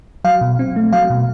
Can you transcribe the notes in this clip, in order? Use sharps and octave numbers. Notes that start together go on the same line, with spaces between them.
F#3 F5
B2
C4
A3
F#3 F5
B2